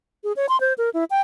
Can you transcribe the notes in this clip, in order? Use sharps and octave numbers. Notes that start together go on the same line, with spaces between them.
G#4
C#5
C6
C5
A#4
E4
G5